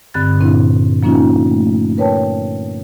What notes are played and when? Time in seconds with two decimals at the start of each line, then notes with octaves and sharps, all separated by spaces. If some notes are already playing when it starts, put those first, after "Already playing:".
0.14 G2 D3 C4 B5 F#6 A6
0.39 A#2 D3 C4 D4 E4
1.03 F3 A#3 C#4 D#4 F4
1.47 A3
1.98 A#4 B4 C#5 G5 A5